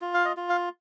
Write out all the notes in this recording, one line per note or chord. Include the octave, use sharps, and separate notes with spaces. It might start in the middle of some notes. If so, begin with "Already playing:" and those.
F4
F5
D#5
F4
F5